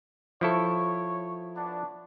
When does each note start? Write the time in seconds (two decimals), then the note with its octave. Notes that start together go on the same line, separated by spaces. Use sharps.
0.41 F3 E4 A4 C#5
1.56 B3 D4